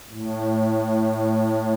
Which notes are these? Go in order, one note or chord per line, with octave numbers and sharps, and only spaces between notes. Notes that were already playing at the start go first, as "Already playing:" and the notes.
A2